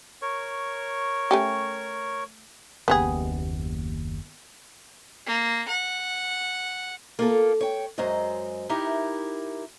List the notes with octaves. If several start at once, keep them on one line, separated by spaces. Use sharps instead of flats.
A#4 C#5 C#6
A3 C#4 G4
F#1 D#2 B3 G4 G#4
A#3
F#5
A#3 F4 A4
C#5 G5
F#2 F#3 G#3 C5 D#5
D#4 E4 G4 A#4